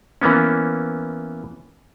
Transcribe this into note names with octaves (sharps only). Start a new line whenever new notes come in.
E3 A#3 B3 C#4